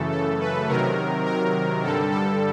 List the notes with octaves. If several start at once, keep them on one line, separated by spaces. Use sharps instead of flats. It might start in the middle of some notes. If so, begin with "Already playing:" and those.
Already playing: F#2 C#3 E3 A3 A4
A4
B4
C3 D#3 F#3 A#4
A#4
G2 D3 G3 A4
A4